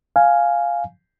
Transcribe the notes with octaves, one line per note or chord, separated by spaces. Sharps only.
F5 G#5